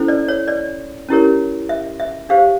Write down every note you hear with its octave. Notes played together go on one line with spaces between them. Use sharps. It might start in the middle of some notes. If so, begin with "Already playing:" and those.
Already playing: C#4 E4 A4 C5
D5
C#5
D5
C#4 E4 G4 A#4 C#5
E5
E5
D4 G4 C5 F5